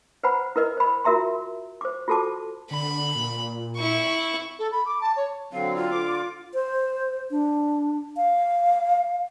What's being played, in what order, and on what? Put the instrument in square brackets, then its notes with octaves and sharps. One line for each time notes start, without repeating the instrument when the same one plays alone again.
[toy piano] B4 C5 F#5 A#5 B5
E4 A#4 B4 D#5
C5 B5
F4 F#4 A#4 E5 A#5 C6
C5 D6
F4 F#4 A4 C5 A5 D6
[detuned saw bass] D3 [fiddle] B5
[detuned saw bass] A#2
[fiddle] E4 C#6
[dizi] A4
B5
D6
A5
C#5
[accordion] D3 F#3 C4 [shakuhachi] F5
[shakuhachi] F4
[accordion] D3 D6
[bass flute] C5
D4
F5